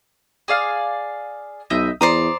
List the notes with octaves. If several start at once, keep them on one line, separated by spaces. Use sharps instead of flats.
G#4 D5 F5
B1 D#5 E5 G6
E2 C5 D5 A#5 D#6